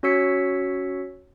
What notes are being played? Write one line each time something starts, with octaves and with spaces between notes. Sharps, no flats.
C#4 F#4 C#5 E6 B6 C#7